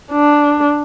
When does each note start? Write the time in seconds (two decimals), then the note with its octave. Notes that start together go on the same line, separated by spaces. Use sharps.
0.12 D4